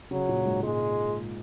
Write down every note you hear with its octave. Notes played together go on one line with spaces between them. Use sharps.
C#3 F#3
A#2
G#2
A#2 G#3